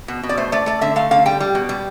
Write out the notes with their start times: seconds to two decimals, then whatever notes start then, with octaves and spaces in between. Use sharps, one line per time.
0.08 B2
0.23 B2
0.29 D5
0.37 A3 C5
0.52 A3 D5
0.66 A3 D5
0.81 D3 E5
0.96 A3 F5
1.11 D3 F5
1.26 G3 G5
1.40 G3
1.55 B2
1.69 G3